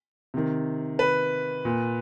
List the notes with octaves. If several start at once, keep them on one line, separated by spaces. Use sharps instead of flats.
C3 D#3
B4
A#2